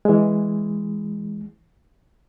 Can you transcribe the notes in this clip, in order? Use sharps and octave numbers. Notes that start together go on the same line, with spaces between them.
E3 G#3